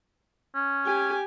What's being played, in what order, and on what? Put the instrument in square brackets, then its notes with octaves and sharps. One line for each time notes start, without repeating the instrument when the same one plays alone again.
[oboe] C#4
[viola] G4 G#5